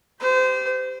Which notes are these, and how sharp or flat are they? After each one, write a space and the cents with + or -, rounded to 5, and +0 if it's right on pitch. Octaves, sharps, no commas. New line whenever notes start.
G4 +0 C5 -30